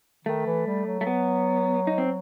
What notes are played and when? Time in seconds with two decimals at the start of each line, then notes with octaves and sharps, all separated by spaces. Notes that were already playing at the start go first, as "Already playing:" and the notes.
0.25 D#3 A3
0.46 E3
0.66 G3
0.86 F#3
1.01 A3
1.07 B3
1.87 D#4
1.98 C4